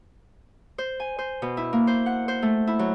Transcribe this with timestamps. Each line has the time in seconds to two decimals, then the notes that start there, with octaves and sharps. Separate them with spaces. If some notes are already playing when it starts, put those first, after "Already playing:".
0.78 C5
1.00 G#5
1.18 C5
1.42 B2
1.57 E4
1.73 A#3
1.87 C5
2.06 F#5
2.28 C5
2.42 A3
2.67 E4
2.79 F#3